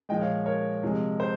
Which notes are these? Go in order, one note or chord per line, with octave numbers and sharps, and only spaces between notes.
A#2 F3 G#3 D#5 G5
C#5 F5
A#4 C#5
C3 F3 G#3
C5